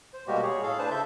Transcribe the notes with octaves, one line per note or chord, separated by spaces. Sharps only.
C5
B2 G3 G#3 A#3 F#4 G4
G#4 C#5
A2 G#4 A4 F5
D4 B4 C5 A5
C#3 A4 E5 G6